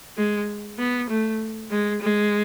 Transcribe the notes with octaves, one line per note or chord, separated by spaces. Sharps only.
G#3
B3
A3
G#3
G#3